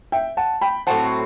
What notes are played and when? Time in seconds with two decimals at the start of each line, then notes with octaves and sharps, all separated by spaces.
0.12 E5 G5
0.37 F#5 A5
0.61 G5 B5
0.87 A2 F#3 C4 F#5 A5